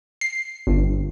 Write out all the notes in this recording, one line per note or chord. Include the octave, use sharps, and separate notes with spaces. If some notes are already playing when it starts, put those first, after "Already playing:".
C7
G1